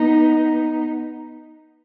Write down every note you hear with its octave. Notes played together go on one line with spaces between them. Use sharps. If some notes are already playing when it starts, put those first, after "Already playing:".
Already playing: B3 D#4